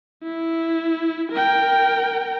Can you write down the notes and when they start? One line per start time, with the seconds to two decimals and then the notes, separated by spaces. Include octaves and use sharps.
0.23 E4
1.31 A#4 G5